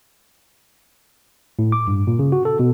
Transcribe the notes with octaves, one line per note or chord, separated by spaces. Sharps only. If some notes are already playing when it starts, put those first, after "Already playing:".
A2
D6
G2
A#2
C#3
F#4
A4
B2